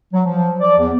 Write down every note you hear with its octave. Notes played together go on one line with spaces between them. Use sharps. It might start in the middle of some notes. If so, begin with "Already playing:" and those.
F#3
F3
D5
E2